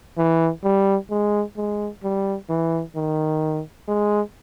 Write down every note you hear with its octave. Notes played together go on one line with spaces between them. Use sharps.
E3
G3
G#3
G#3
G3
E3
D#3
G#3